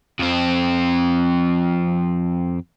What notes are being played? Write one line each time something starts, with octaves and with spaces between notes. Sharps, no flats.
F2 C4